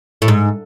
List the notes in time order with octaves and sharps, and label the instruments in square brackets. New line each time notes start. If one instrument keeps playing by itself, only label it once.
[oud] A2
G#2